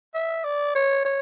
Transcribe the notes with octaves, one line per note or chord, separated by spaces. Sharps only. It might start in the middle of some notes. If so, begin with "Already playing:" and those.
E5
D5
C#5
C#5